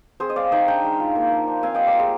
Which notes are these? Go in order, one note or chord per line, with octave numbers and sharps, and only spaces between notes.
C4 G#4 C5
D#5
G#3 D5 F5
D#4 D#5 G5
D4 G5 A#5
G#3
F4
A#3
F3
D4
C4 F5 G#5
G3 D#5 G5
A#4 D5
F4 G#4 C5